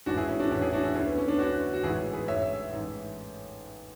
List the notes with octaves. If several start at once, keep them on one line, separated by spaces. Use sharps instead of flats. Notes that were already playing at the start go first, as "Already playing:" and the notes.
A1 G#2 E3 D4 F#4
E4 G#4
C#4 E4
D4 F#4
A1 G#2 E3 C#4 E4
E4 G#4
D4 F#4
C#4 E4
D2 D3 C#4
B3
C#4
B3 D4
D2 D3 D4 F#4
F#4
A1 G#2 E3 E4 G#4
G#4 B4
A1 G#2 E3 C#5 E5
A1 G#2 E3